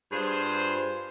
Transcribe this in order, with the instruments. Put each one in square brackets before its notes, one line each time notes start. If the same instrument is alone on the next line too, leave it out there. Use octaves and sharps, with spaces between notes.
[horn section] G2 F4 G#4 C5